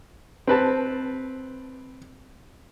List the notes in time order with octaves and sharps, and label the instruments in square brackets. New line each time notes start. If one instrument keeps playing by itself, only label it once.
[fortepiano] C4 B4 A5